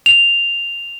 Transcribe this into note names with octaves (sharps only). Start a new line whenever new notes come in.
F7